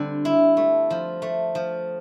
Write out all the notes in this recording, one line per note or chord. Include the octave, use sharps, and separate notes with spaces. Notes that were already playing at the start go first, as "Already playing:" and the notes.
Already playing: D3 G3 C4 D4
E4
A3
F3
A3
F3